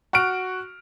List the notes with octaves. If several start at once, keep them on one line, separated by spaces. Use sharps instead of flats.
F#4 C#6 F6 D7